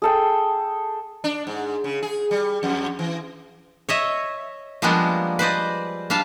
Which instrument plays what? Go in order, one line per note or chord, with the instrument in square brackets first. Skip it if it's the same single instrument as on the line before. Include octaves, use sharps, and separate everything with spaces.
[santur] G#4 A4 G5
[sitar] D4
G#2
C#3
G#4
G3
F2
E3
[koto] C#5 D#5 E5
F3 G3 G#3 A#3 B3 D4
B4 C5 D5 D#5
G3 D4 F5 A5